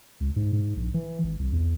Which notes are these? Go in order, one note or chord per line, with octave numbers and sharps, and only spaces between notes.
C#2
G#2
G#2
A#1
E3
G#1
C2
E2